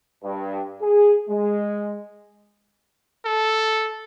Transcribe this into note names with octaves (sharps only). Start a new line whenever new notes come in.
G2
G#4
G#3
A4